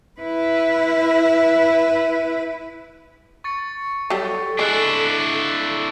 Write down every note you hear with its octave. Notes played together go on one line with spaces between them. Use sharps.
E4 B4
C#6 A6 C#7
F#3 G3 A4
G#3 D4 E4 F#6 A6 C7